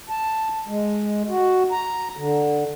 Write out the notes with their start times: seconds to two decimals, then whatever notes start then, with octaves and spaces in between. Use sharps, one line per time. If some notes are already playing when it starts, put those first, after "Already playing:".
0.09 A5
0.67 G#3
1.28 F#4
1.72 A#5
2.17 D3